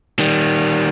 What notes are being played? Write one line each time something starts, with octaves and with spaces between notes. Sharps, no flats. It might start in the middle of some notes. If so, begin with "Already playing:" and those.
D#3 G3